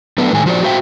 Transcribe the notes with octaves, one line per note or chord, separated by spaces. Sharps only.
F#3 A3 B3 D4 B4
A2 D#3 G#3 G#5
F3 F4 F#4 B4 C5 D5
F#4 C5 E5 F5 G5